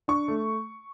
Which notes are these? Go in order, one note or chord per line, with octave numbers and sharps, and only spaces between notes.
D4 C#6
A3